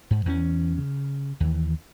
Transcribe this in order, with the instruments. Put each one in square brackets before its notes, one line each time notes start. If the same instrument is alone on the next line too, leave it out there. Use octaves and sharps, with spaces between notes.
[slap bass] G#2
E2 E3 A#3 C#4
C#3
D#2 E3